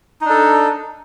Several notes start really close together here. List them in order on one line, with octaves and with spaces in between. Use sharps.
D#4 D4 A4